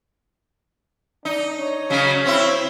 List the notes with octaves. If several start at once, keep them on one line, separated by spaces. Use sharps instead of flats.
D4 D#4
C#5
C#3 F#3
C4 E4